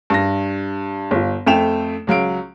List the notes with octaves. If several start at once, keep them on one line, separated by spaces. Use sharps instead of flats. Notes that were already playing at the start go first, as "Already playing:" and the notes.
G2 A#6
G1 F4
F2 A3 G5 E7 F7
C#2 F#3 F5 D7